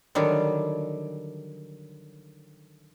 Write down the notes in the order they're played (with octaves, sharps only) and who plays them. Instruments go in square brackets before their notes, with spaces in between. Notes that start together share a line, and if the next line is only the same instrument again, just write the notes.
[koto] D3 D#3 F#3 G3